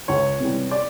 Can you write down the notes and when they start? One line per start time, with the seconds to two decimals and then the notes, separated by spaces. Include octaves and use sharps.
0.08 C#2 C#5
0.40 C3 E3 G3
0.71 D5